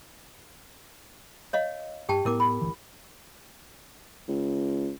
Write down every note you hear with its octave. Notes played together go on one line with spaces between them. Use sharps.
C#5 D#5 F5
G2 G4 G5 A5
A2 B3 E4 A#4 D6
B5
G1 D2 E3
C#2